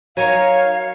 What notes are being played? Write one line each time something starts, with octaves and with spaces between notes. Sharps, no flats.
F#3 D#4 A#4 C#5 F5 G#5